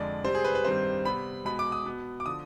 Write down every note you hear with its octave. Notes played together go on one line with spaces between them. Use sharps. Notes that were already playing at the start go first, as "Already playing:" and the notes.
Already playing: F2 D3 G#3 D5
C3 G3 C4 C5
G#4
B4
B4
G2 D#3 G3 C4 C5
C3 G3 B3 B5
B2 G#3 B3 B5
D6
D#6
B2 B3
D6
D3 F3 D#6